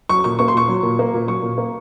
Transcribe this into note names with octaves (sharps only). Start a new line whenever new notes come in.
F#3 C#6
A#2 C#6
A#3 C#6
C6
A#2 C#6
F#3
A#2
A#3
A#2
F#3 C#6
A#2
A#3